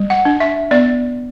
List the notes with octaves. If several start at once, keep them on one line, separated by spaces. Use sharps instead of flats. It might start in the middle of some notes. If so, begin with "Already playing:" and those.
Already playing: G3
F#5
D4
E5
B3 D5